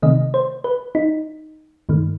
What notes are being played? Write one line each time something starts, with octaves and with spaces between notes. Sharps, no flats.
C3 D#3 A3 D#5
C5
B4
D#4
G2 D#3 A3